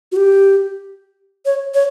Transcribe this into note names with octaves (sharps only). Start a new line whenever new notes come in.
F#4
G4
C#5
C#5